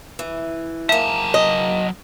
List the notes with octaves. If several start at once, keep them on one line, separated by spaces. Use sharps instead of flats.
E3
G#2 F#3 A#3 E5 A5
D#5